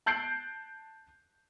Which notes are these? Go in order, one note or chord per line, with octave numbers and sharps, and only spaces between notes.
A5 F#6 G6 C7 D7